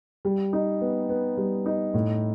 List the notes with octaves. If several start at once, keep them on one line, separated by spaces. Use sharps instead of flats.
G3
D#4
B3
B3
G3
D#4
A2